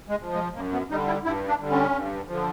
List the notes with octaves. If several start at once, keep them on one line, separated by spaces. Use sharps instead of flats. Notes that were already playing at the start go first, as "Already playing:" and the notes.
G#3
F3
G#3
F#2 A#3
B3
D3 G3 D#4
E4
G2 E4
D4
D3 G3
C#4
G2
D3 F3